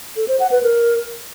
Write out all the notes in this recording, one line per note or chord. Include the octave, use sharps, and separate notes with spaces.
A4
C5
F#5
B4
A#4